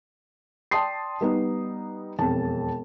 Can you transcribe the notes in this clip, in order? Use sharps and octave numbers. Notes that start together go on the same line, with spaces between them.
D5 G5 A5 C6 D#6 C7
G3 B3 D#4
E1 F2 A5